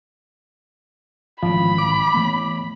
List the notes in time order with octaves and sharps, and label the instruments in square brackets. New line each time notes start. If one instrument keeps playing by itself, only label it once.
[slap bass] G#1 C#3 E3 [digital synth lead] F3 [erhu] B5
[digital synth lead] D6
[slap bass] E3 A3 B3